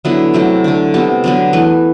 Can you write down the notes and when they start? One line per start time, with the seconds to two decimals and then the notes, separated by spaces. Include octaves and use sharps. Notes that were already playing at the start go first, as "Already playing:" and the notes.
0.05 D3 F#3 B3 E4
0.34 C3 F#3 A3 G4
0.64 D3 A3
0.94 C3 G3 B3 G4
1.24 D3 F#3 B3
1.53 E3 A3 B4